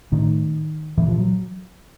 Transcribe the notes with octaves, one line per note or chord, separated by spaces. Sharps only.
A2 D#3
A#2 E3
F3
F#3